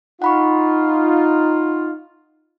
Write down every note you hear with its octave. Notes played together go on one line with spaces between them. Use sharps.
D#4 F4 F#5 B5 C#6